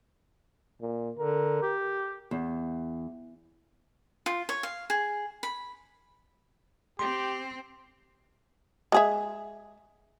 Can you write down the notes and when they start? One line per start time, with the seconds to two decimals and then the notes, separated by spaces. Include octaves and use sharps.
0.81 A#2
1.19 D3 A#4
1.63 G4
2.31 E2
4.26 F4
4.49 C#5
4.63 F5
4.90 G#4
5.43 B5
6.99 C4 G4 C6
8.92 G#3 G#4 E5